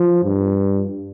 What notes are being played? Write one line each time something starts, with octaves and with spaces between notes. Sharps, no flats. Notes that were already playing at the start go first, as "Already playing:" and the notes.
Already playing: F3
G2